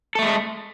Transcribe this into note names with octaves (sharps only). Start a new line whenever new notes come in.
G#3 A3 A4